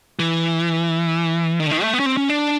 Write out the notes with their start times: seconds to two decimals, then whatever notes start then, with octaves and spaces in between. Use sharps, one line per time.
0.19 E3
1.60 D#3
1.66 D3
1.71 D#3
1.82 A3
1.93 B3
2.00 C#4
2.06 C4
2.17 C#4
2.29 D4